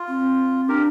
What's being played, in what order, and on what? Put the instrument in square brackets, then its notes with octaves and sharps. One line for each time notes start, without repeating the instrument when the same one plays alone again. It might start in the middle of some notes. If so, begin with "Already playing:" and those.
Already playing: [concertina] F4
[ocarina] C4
[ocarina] D4 [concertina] G4 A#4